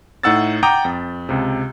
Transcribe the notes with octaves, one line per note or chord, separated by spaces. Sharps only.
A2 D#4 F#5 E6 A6
F#5 G5 A#5 D6 D#6 G6
F2
C#2 C3